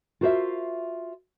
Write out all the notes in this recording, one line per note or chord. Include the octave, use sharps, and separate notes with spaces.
F4 F#4 A#4 C5 D#5 E5